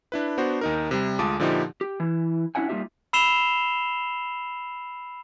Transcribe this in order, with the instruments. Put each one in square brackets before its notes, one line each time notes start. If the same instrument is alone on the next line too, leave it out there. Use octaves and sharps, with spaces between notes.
[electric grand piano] D4 E4 B4
B3 D4 F#4 C5
D#2 D#4 A#4
C3 G3
D2 G#3 F4 A5 D6 D#6
A#2 D3 F3 D#4 E4 G4
[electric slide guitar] G4
E3 E4
C#4 D4 E4 E5 F#5 G#5
G3 A#3 D#4 F4 G4 E5
[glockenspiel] B5 E6 C7 E7 F7 G7